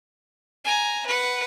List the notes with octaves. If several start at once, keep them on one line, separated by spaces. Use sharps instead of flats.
G#5 A#5
B4 F#5